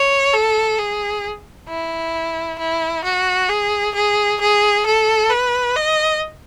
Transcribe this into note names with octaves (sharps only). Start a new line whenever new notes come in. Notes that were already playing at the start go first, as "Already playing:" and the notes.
Already playing: C#5
A4
G#4
E4
E4
F#4
G#4
G#4
G#4
A4
B4
D#5